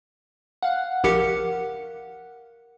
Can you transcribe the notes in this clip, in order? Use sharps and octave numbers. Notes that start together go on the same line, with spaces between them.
F5 F#5
A#1 G4 A#4 C#7